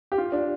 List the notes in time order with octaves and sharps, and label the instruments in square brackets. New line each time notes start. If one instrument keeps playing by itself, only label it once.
[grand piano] G4
F4
D4